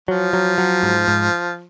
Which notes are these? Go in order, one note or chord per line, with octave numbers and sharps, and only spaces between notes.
F3 F#3
F#3
F#3
G#2
G#2